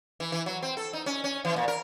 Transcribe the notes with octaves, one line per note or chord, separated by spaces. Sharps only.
E3
E3
F#3
C4
A4
D#4
C#4
C#4
E3
A#2
A#4